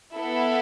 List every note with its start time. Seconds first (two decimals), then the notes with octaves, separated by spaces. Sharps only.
0.15 B3 E4 A4